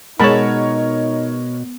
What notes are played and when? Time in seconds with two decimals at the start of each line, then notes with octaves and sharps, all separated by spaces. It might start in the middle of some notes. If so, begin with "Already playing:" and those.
0.20 B2 G#3 D#4 A#4 C#5 A5 B5